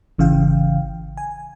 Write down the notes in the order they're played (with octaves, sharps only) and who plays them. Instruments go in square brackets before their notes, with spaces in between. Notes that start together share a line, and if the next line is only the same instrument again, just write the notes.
[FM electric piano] G#1 C#3 E3 F5 G5
G#5